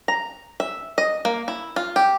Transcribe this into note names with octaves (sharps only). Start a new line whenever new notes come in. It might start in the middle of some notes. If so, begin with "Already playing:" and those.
A#5
E5
D#5
A#3
E4
F4
G4